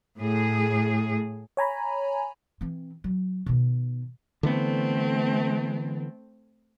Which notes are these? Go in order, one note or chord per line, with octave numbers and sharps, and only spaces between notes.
A2 G#4
C#5 G#5 A#5 B5
E3 C4
F#3
B2 D#3
D3 E3 A3 B3 C4